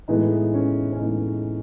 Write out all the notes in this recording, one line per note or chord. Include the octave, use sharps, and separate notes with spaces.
A2 E3 G#3 B3 D#4
C#4
C#4
A2 E3 G#3 B3 D#4